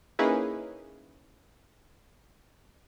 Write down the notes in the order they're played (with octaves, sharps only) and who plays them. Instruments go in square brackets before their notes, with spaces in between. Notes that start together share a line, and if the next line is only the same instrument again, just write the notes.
[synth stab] A#3 C#4 D#4 E4 G#4 B4